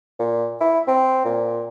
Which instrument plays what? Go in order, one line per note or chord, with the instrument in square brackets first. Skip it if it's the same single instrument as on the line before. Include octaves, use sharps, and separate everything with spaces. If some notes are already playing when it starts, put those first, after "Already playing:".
[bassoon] A#2
E4
C4
A#2